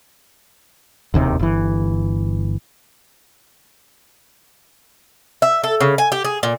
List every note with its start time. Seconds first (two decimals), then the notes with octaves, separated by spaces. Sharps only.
1.14 E1 D#2 C3 D#3
1.39 G1 E3
5.42 E5
5.64 A4
5.81 C#3
5.98 G#5
6.12 G4
6.24 G#4
6.43 A#2